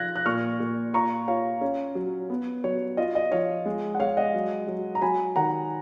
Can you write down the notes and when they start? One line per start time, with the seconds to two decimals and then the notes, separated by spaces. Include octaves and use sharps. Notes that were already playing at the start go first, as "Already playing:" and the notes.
Already playing: F3 F4 F#6 G#6 A#6
0.16 F#6
0.26 A#2 C#6 F6
0.60 A#2
0.93 F4 A#5 C#6
1.28 F4 C#5 F5
1.61 C#4
1.95 F#3
2.30 B3
2.64 F#3 C#5
2.97 F4 D#5
3.15 D#5
3.32 F3 C#5 F5
3.66 G#3
3.95 F#5
4.00 G#3 C#5 F5
4.17 D#5 F#5
4.35 F#3
4.67 F#3
4.95 A#5
5.02 F#3 G#5 B5
5.36 D#3 F#5 A#5